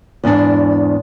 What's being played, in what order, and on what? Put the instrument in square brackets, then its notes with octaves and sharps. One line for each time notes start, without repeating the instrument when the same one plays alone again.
[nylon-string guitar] E2 G#2 D4